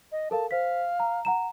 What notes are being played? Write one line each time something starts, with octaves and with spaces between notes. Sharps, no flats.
D#5
A4 A#4 F5 A5
C5 F5 B6
A#5
F#5 A#5 E7